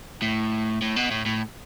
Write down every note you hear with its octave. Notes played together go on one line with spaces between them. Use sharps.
A2
A2
B2
A2
A2